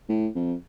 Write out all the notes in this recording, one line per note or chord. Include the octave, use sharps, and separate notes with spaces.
A2
F2